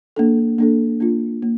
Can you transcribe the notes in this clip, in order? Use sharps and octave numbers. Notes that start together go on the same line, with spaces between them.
A#3 D4 A4
A#3 D4 A4
A#3 D4 F4
A#3